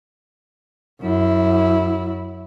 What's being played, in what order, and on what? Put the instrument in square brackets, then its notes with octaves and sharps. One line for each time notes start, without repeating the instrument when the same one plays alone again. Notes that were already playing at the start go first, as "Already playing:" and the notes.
[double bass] F#2 E4